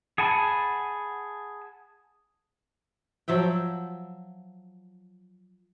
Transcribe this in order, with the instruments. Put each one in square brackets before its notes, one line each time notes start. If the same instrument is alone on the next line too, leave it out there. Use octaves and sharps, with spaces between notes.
[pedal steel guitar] G#4 F#5 G#5 A5 B5
[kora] F3 F#3 E5 G5